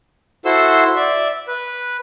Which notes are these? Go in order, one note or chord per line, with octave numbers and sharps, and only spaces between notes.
E4 F#4 A4 C5 C6 E6
D5 E5
B4